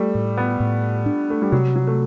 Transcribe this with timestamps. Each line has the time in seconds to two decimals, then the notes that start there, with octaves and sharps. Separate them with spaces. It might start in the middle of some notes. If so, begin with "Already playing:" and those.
Already playing: G3 A3
0.15 A2
0.38 B3
0.60 A2
1.06 D4
1.30 A3
1.42 G3
1.52 C3 F#3
1.76 F#3
1.87 A3